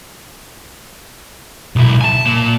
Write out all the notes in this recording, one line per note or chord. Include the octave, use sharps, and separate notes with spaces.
B1 E4
G#5 A5
A#3 F4